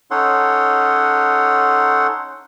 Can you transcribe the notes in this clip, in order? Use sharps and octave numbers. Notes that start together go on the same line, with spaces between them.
C#4 D#4 A4 C#5 F#5 C6